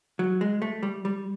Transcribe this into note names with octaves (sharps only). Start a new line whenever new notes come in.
F#3
G#3
A3
G3
G3